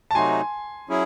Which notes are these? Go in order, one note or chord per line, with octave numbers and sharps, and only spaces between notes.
A5
C3 F#3 A3 D#4 F#4 G#5 C6
F#3 C#4 E4 G#4